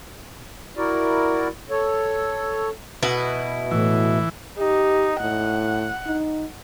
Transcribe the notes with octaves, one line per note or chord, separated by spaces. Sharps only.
E4 F#4 A#4 D5
A4 C#5
B2 E4 B4
A2 E3
D#4 G4
A2 F#5
D#4